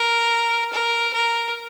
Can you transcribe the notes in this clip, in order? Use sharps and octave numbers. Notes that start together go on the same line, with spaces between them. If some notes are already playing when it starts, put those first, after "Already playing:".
Already playing: A#4
A#4
A#4